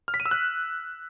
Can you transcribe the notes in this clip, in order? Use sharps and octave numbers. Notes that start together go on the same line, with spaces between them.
F6
B6
D#7
E6
F#6